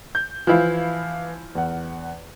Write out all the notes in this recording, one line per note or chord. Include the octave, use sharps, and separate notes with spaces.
G6
E3 F3 E4 F5
E2 F#5